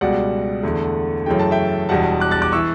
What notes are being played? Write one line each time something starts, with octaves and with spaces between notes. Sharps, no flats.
C#2 B2 G3 D5 F#5
E2 D3 A3
F#2 C#3 E3 A3 G5
A5
E5 G5
E1 E2 B2 G3 F#5 A5
D6 F#6
F#6 A6
D6 F#6
E3 C#6 E6